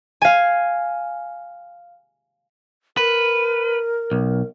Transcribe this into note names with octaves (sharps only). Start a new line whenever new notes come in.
F5 G#5
A#4 B4
B1